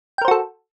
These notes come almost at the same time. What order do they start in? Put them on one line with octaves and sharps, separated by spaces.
G5 A#4 C5 F#4 A4